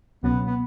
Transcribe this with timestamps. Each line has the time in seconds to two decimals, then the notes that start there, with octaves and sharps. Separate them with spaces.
0.23 C#2 B2 F#3 B3 C#4
0.46 B3